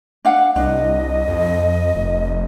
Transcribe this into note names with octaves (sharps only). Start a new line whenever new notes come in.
D4 F5 F#5
C2 D4 D#5
F2
F1